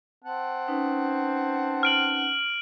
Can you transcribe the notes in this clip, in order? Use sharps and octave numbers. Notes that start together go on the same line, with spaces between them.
C4 F#5 A5
C#4 D#4 B4
F6 D7 F#7